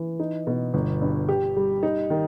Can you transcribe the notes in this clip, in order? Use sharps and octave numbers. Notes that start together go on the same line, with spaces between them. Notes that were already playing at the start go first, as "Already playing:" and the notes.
Already playing: E3
D#4
B2
G1
G2
G4
G3
D#4
D#3